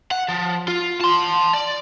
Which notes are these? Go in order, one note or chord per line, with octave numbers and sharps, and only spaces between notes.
F#5
F3
F4
A5 C6
D5